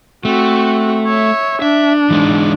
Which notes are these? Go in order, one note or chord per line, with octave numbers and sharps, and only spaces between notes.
A3 C4 F#4
C#5 E5
D4 E5
E3 G#3 D#4